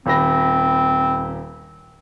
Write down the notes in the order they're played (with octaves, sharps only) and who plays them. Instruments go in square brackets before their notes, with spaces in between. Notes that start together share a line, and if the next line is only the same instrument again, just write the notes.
[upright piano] D#1 B5 A#6 [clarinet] C4